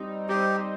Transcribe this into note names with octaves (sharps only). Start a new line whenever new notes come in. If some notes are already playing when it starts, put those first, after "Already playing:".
Already playing: G3 C4 D#4
G3 C4 D#4 G4